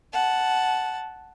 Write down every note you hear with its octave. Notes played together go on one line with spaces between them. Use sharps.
F#5 A5